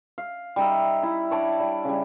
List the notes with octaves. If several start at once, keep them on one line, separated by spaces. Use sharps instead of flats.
F5
G3 D#4 E5
E4
D4 C#5 D5 A5
G3
C#3 G3